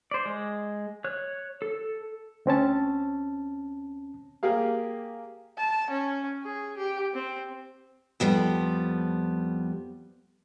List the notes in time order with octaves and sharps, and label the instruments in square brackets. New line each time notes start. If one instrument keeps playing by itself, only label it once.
[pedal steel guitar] C5 D5
G#3
C#5 F#6
A4
[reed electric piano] D2 C4 C#4 A5
[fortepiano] A#3 G4 G#4 F5
[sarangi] A5
C#4
G#4
G4
C4
[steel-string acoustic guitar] F2 F3 G3 B3